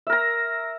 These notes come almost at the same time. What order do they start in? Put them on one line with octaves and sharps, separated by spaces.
E5 A#4 A#5